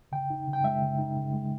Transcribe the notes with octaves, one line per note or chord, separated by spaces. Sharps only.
C#3 G5
D#4
C#3
G5
G#3 E5
C#3
D#4
C#3
G#3